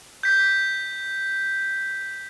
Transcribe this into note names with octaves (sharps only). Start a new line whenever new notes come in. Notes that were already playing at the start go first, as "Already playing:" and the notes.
G6 B6